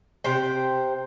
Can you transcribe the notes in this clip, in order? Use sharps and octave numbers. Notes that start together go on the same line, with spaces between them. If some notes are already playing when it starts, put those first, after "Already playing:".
C3 C5 G5